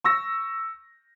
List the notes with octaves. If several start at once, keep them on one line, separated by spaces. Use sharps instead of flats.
C#6 E6 A#6